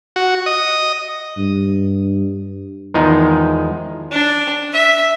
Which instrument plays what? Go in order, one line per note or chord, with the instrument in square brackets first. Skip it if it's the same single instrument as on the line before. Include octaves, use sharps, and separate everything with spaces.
[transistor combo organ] F#4
D#5
[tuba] G2
[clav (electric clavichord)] E2 D#3 F3 G#3 D#4
[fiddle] D4
E5